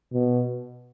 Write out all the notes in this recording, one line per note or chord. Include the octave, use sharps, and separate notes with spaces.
B2